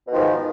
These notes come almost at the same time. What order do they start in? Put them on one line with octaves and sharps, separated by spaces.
B2 D#3 F3 G#2